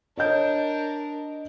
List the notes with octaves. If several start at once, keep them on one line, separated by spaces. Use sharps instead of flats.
D4 A#4 C#5 D#5 G6